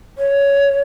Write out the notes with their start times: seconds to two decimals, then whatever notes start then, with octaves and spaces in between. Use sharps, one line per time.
0.18 C#5